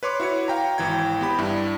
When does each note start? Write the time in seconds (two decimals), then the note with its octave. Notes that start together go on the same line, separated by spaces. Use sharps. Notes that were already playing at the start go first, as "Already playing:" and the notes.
0.03 B4 C#5 C6 D6
0.20 E4 F#4 C#5 C#7
0.48 F5 G5 A#5
0.78 G#1 E3 G5 G#6
1.21 B3 G4 B5
1.38 G2 D4 E4